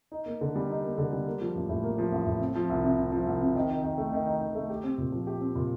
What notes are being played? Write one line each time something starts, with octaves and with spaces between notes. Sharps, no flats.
D#4
A#3
D3
G3
D#4
A#3
D3
G3
A#3
F3
A1
A2
A#3
F3
A1
A2
C4
F3
C2
C3
C4
F3
C2
C3
D#3
D#4
D#3
A3
D#3
D#4
D#3
A3
G4
C4
A#2
F3
G4
C4
A#2